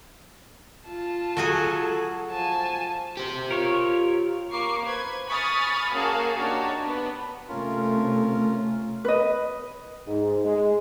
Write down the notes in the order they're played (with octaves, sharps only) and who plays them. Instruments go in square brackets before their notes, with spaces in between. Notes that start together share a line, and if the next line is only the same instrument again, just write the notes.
[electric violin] F4 A5
[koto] F#3 F#4 G#4 [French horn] A4
[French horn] F3 [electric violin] G#5 A5
[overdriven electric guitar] G4 C5
[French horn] F4 [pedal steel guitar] A#4 C#5
[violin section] A#3 C#6 D6 C7
B4 C5 G#6
G#5 B5 C#6 D#6 F6 A6
A#3 C#4 F#4 G#4 F5 A5
D4 D#4 F#4 G4 C#5 A5
B3 D4
[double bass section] C3 A3 [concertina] C#4 F4 A#4
[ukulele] B4 D#5
[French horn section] G#2
G#3